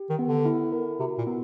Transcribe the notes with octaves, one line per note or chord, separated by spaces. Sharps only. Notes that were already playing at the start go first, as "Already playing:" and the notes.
Already playing: G4
D#3
B3
D3
E4
A#4
C3 F#4
A#2
B3